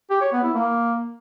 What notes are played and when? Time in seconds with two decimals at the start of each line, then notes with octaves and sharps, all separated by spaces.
0.10 G4
0.21 C#5
0.32 B3
0.43 E4
0.54 A#3